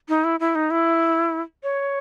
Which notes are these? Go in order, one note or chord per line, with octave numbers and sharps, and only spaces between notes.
D#4
E4
E4
D#4
E4
C#5